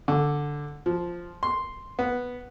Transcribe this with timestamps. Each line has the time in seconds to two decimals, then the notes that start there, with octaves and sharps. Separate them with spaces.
0.08 D3
0.86 F3
1.43 C6
1.99 B3